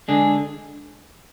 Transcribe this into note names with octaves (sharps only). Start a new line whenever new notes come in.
D3 G#3 D4 G#4